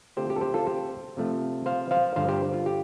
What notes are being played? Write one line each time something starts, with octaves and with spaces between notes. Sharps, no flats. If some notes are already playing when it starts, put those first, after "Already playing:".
D3 A3 C4 F4 G4 C5
G4
A4
G4 C5
F4 A4
G4 C5
C3 F3 A3
C5 F5
C5 F5
G2 D3 F3 C5 F5
G4 C5
F4
G4